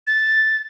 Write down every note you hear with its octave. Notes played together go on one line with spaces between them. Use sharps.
A6